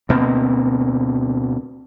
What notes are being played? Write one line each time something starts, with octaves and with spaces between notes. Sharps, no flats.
D2 B2 A#3 C4